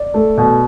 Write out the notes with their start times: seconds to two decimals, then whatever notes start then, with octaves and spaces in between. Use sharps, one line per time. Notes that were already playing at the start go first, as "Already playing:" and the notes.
Already playing: D5
0.14 A3
0.37 B2